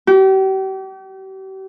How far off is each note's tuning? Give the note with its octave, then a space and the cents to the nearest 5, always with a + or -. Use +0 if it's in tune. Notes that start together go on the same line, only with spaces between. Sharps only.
G4 -40